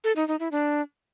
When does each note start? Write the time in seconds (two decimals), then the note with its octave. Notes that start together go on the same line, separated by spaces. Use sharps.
0.04 A4
0.16 D#4
0.28 D#4
0.40 E4
0.52 D4